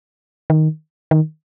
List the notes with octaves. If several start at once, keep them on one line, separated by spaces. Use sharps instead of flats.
D#3
D#3